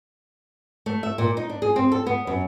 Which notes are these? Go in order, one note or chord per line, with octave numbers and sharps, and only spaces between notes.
A3
E5
A#2
D#4
D4
G#4
C4
A4
B3
F#2